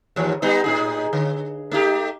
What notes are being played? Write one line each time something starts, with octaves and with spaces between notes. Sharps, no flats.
D#2 G#2 E3
G3 B3 D#4
A2 D#4 G#4
D3
A3 D#4 G4